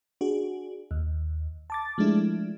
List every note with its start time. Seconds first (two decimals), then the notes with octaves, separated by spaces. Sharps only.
0.21 D4 F#4 G#4
0.91 D#2
1.70 A5 D6 A6
1.98 F3 G#3 A3 D4 E4